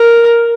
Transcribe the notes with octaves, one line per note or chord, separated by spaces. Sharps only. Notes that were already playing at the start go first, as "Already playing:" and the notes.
Already playing: A#4